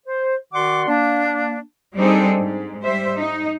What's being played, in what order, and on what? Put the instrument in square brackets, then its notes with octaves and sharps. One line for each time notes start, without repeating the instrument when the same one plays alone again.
[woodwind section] C5
D#3 F#4 D5 F#5 C6 D6
A#3 D4
[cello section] G3 C4 D4 D#4 G#4 A4
G#2
G3 C5 E5
D#4